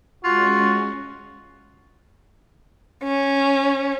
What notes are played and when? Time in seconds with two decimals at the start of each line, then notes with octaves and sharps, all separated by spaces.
0.24 G#3 C#4 F4 F#4
3.03 C#4